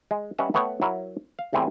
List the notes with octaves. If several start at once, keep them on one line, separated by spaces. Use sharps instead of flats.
G#3
G3 C#4 B4 D#5 E5 F#5
A3 B3 B4 C#5 G5
F#3 E4 A#4
F5
E2 A2 G3 C4 G#5